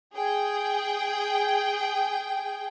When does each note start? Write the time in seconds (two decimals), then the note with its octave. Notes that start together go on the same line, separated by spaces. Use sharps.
0.15 G#4 G5